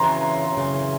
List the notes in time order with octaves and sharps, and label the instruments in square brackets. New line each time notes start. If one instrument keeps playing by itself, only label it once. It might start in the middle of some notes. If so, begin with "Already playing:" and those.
Already playing: [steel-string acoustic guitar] F#2 C#3 E3 [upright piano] A#5 C6
[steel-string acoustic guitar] F#2 C#3 E3